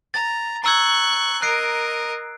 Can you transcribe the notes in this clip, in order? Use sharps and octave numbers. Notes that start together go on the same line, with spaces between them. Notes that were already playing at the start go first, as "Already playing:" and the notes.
A#5 A6
A#5 C#6 E6 F#6 G#6
A#4 D#5 F#6 C7 D7